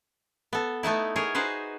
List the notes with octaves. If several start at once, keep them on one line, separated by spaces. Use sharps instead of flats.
B3 A4
A3 B3 D#4 E4
G#4 A#4 C#5
D#4 F#4 G#4 B4 C5